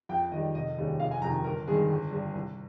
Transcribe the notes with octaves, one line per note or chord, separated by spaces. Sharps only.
F2 G5
D#3 G3 D#5
F1 D#5
D#2 C#3 G3
F1 F5
G#5
F2 C3 D#3 A#5
G1 A#4
G2 D#3 G#3 G#4
G1
G2 G3
C2